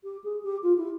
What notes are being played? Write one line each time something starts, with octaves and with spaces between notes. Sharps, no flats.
G4
G#4
G4
F4
E4